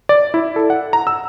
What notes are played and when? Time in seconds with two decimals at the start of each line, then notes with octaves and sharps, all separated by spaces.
0.09 D5
0.34 E4
0.56 A4
0.70 F#5
0.93 A#5
1.07 E6